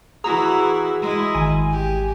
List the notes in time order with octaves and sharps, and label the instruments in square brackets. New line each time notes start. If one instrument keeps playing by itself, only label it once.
[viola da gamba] E3 E4 F#4 [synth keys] G#4 A#5 E6
[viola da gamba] G#3 E4
[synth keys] G#1 G#5
[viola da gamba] G4